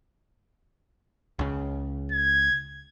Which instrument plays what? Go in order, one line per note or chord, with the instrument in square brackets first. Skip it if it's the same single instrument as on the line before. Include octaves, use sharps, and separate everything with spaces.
[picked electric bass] C#2 C#3
[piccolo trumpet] G#6